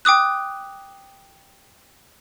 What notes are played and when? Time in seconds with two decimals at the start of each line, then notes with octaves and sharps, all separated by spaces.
0.05 G5 D6 D#6 F#6